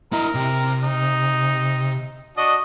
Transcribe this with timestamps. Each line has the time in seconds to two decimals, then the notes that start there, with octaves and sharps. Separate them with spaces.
0.13 E4 A#4 D#5
0.35 C3
0.83 D#4
2.37 D4 F#4 D#5